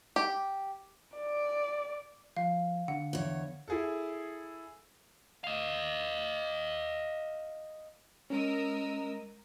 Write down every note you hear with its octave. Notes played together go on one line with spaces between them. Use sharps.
G4
D5
F3 F5
D3 D4 F#5
E2 C#5
E4 G#4 A4
D#5 F5
G#3 C#4 A#4 D#6 E6